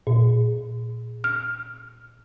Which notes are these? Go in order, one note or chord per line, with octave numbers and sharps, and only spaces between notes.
A#2
F6